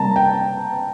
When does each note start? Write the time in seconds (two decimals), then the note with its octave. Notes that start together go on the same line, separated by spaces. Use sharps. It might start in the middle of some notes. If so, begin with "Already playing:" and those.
Already playing: C3 G3 A#3 A5 A#5
0.16 G5